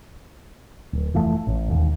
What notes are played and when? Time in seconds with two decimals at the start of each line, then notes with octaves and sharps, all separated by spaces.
0.93 D1
1.14 F1 E3 F3 A3
1.47 A1
1.68 E1 D#2